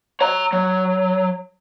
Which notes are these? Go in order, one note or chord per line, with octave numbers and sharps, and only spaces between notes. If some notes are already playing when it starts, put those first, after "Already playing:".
C#5 A#5
F#3